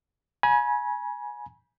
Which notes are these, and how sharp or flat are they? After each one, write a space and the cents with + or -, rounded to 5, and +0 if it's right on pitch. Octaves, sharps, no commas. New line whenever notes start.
G#5 +10 B5 -40